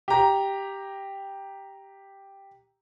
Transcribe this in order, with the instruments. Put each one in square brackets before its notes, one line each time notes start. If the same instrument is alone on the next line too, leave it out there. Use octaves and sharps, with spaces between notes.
[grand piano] G4 A#5